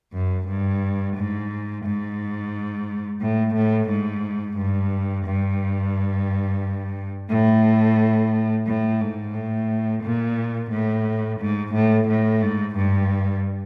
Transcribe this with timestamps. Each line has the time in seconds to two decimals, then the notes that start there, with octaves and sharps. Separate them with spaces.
0.13 F#2
0.48 G2
1.17 G#2
1.85 G#2
3.21 A2
3.54 A2
3.90 G#2
4.57 G2
5.25 G2
7.30 A2
8.67 A2
9.01 G#2
9.34 A2
10.04 A#2
10.71 A2
11.40 G#2
11.74 A2
12.08 A2
12.42 G#2
12.76 G2